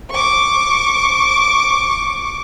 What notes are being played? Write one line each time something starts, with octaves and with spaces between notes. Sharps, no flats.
C#6 D6